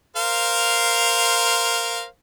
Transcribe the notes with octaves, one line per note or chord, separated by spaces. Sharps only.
A#4 C5 F5